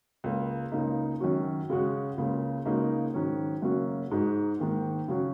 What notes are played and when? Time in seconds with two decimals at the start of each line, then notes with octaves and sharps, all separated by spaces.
0.24 C#2 C#3 A#3
0.72 C#2 C#3 A#3 D#4
1.20 F#2 D#3 F#3 C#4 F#4
1.70 C#3 G#3 C#4 F#4
2.18 C#2 C#3 A#3
2.65 C#2 C#3 A#3 D#4 F#4
3.14 G#2 D#3 F#3 C#4
3.62 F#2 C#3 A#3 C#4 F#4
4.11 G#2 G#3 D#4 F#4
4.59 G#2 D#3 A#3
5.08 C#3 F#3 C#4 F#4